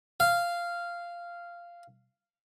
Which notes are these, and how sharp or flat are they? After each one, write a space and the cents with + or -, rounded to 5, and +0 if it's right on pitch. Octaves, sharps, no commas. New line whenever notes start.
F5 -10